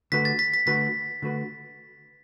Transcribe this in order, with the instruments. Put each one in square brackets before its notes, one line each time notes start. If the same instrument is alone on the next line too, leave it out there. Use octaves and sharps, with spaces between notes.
[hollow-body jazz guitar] D3 A3 F#4 B4 [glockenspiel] B6
[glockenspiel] A6
B6
B6
[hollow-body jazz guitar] D3 A3 F#4 B4 [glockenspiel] B6
[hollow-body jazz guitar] D3 A3 F#4 B4